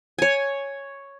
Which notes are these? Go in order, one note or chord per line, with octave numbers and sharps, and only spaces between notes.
C#5 G#5